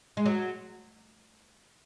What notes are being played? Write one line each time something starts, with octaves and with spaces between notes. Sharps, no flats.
G#3
F#3